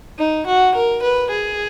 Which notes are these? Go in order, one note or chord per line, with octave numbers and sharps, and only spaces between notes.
D#4
F#4
A#4
B4
G#4